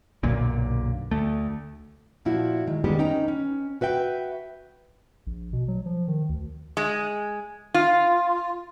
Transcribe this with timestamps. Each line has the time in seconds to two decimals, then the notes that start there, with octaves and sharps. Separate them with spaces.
0.23 B1 F#2 A#2 D3
1.11 D2 A3
2.25 A#2 F3 E4 F#4
2.67 D#3 G#3
2.84 D#3 G3 G#3 B3 G4
2.99 C#4 D#4 B4 G5 A#5
3.28 C#4
3.81 F#4 B4 E5 G5
5.27 A#1
5.53 B2
5.68 F#3
5.86 F3
6.08 D#3
6.29 D2
6.77 G#3
7.74 F4